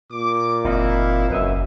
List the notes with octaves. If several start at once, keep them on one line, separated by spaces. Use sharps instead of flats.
A#2 D6
F#1 F3 C4 D#4 E4 F5
F#1 F#2 B4 D#5 E5